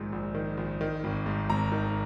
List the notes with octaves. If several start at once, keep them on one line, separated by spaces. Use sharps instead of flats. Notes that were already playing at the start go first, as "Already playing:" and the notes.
Already playing: A#1 G#2 D#3
A#1
D#3
A#1
D#3
G#1
G#2
G#1 A#5
D#3